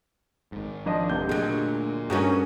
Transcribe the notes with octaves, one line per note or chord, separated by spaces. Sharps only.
G#1 G#2
F3 D4 D#5
F1 C3 G6
D2 A#2 F#3 G#3
G2 A3 C#4 F#4 G#4 A#4